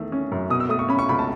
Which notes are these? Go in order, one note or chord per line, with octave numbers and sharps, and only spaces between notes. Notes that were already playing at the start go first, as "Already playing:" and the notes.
Already playing: E2 D#3 A3
C#4
F#2
B2 D#6
E6
A3 D#6
C#6
C#4 B5
C#6
C#2 B5
A5